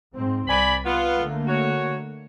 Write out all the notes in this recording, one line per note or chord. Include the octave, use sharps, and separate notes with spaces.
G#2 C4
C2 D5 G#5 B5
B3 F4
D3 A3 A#3
F#4 C#5